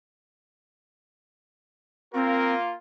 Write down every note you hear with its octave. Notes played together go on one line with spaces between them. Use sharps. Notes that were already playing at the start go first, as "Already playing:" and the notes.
A#3 C4 F4 A#4